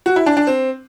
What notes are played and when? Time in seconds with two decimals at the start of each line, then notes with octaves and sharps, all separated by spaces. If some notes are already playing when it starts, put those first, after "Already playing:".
0.06 F#4
0.16 E4
0.26 D4
0.37 D4
0.47 C4